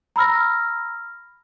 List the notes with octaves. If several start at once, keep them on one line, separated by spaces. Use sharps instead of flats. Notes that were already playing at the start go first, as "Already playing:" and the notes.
A#5 B5 E6 F6 A#6